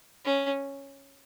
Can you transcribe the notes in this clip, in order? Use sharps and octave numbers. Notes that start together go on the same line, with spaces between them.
C#4